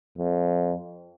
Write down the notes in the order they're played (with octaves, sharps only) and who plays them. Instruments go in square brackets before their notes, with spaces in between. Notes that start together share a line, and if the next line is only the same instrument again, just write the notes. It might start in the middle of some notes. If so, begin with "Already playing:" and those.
[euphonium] F2